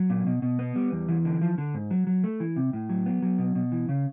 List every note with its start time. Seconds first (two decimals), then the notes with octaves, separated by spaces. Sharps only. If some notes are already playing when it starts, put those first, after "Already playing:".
Already playing: F#3
0.10 A#2
0.26 B2
0.42 B2
0.59 B3
0.76 G3
0.92 E2
1.09 E3
1.25 D3
1.41 F3
1.58 D3
1.74 G#2
1.91 F#3
2.07 F#3
2.24 A3
2.40 E3
2.56 C3
2.73 A2
2.89 F#3
3.06 B3
3.22 F#3
3.38 B2
3.55 B2
3.72 E3
3.89 C#3